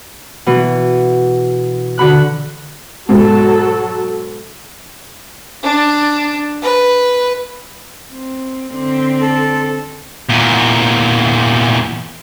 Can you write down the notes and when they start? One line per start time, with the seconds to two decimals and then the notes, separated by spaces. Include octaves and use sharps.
0.46 B2 E3
1.98 D3 F#4 B5 F#6
3.09 G#2 B2 F#3 A4
5.63 D4
6.62 B4
8.12 C4
8.72 D3 C4
9.22 A4
10.29 E2 A#2